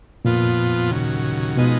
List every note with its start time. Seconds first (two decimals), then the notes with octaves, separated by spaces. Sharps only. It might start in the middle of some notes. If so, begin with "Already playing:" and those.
0.25 F2 A#2 F3 B3 F4
0.91 D#2 C#3 F#3
1.57 B2 F3 G#3 B3 D#4